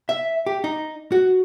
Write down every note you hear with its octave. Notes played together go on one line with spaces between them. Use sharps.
E5
G4
D#4
F#4